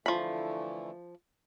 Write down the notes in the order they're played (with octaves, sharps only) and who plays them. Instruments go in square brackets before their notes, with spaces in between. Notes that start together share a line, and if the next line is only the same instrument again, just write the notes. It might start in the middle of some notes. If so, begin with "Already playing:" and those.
[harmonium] D3 E3 A3 [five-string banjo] F3 B5